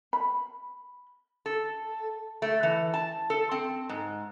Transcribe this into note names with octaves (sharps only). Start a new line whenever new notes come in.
B5
A4
A3
E3
A5
A4
C4
G#2